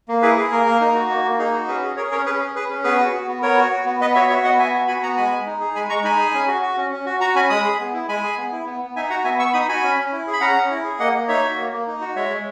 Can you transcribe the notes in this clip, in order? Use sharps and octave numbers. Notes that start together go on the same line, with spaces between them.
A#3
E4 G#4 B4
G#4
A#3 A#4
A#3
D#4
F#4
A#3
A#3
D#4 G#4
F#4
C#4 G#4 B4
G#4
G#4 A#4 C#5
C#4 A#4 C#5
C#4 G#4 B4
G#4
G#4 B4
C#4
B3 G#4 B4
F#4
F#4
B3
B3 A#4 C#5
F#4
F#4
B3
B3 B4 D#5
F#4 C#5 E5
F#4 C#5 E5
B3 D#5 F#5
B3 E5 G#5
F#4
F#4 G#5 B5
B3 F#5 A#5
G#3 G#5 B5
G#3
D#4
G#4
G#3 G#5 B5
G#3 A#5 C#6
D#4 G#5 B5
G#4
C#4
F#4
F#4
C#4
C#4
F#4
F#4 F#5 A#5
C#4 G#5 B5
G#3 B5 D#6
G#4
B3
E4
G#3 G#5 B5
G#4
B3
E4
B3
B3
D#4 E5 G#5
F#4 F#5 A#5
B3 E5 G#5
B3 C#6 E6
D#4 B5 D#6
F#4 G#5 B5
C#4
C#4
E4
G#4
B5
C#4 F#5 A#5
C#4
E4
G#4
A#3 D#5 F#5
A#3
D#4 C#5 E5
F#4
A#3
A#3
D#4
F#4
G#3 C#5 E5
G#3